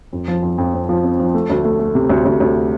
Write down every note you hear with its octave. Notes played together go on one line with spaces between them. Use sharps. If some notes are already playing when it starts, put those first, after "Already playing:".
F2
F3
F2
F2
C4
F3
C4
F3
A3
D2
A3
A3
C3
D2
D2
D2